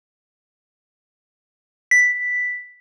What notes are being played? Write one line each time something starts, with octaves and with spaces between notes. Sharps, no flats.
B6